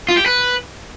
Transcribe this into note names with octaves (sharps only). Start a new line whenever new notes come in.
F4
G4
B4